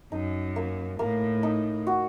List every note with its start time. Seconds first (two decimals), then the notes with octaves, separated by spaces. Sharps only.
0.12 F#2 D#4
0.56 A#3
0.99 A2 A#3
1.43 D#4
1.87 F#4